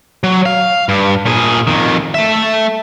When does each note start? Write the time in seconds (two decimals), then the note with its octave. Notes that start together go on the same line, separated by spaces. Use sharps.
0.24 F#3
0.46 F5
0.89 G2
1.26 A#2 G#4
1.67 F2 D#3
2.14 A3 E5